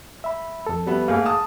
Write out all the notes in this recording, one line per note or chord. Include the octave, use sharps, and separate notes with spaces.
E5 B5
F2 A4
G3 B3 E5
G#2 A3 A#3 G#4 F5
A5 D#6